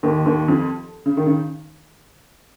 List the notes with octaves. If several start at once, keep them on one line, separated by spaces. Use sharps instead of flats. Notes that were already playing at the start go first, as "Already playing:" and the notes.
D#2 D#3
D#2 D#3
F2 F3
C#3
D#3
C#3